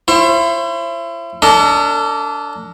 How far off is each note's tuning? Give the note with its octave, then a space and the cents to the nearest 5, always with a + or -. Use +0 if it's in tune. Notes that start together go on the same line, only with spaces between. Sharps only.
E4 +40 C5 +40
D4 -25 A4 +45 D#5 +0